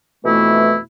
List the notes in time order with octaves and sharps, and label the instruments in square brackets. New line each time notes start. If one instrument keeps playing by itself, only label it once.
[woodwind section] F2 B2 E3 A3 E4